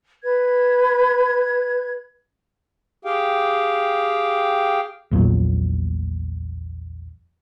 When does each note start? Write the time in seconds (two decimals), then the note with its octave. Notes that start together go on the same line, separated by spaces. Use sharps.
0.23 B4 G#6
3.05 G4 G#4 F5 G5
5.11 A#1 E2 A#2 F#3